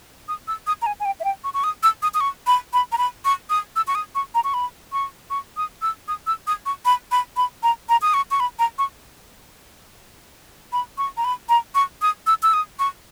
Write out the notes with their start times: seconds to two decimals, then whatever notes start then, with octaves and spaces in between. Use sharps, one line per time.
0.28 D#6
0.48 E6
0.67 D#6
0.82 A#5
0.86 G#5
1.00 G#5
1.05 G5
1.20 E5
1.24 G5
1.44 C#6
1.54 C#6
1.64 D#6
1.83 E6
2.02 D#6
2.14 D#6
2.21 C#6
2.47 B5
2.73 B5
2.92 A#5
2.98 B5
3.25 C#6
3.50 D#6
3.76 E6
3.88 C#6
3.95 D#6
4.15 C#6
4.35 A#5
4.44 C#6
4.54 B5
4.93 C#6
5.30 C#6
5.57 D#6
5.82 E6
6.08 D#6
6.27 E6
6.47 D#6
6.66 C#6
6.85 B5
7.12 B5
7.37 B5
7.63 A#5
7.89 A#5
8.02 D#6
8.14 C#6
8.31 C#6
8.40 B5
8.59 A#5
8.78 C#6
10.72 B5
10.98 C#6
11.17 A#5
11.24 B5
11.49 A#5
11.75 C#6
12.02 D#6
12.27 E6
12.43 E6
12.53 D#6
12.79 C#6